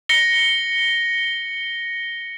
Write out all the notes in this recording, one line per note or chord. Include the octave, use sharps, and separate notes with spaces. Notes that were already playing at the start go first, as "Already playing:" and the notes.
A#6 C#7 G7